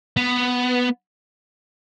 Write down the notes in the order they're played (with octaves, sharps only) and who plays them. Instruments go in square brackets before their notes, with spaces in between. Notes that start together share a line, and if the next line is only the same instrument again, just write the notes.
[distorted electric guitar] B3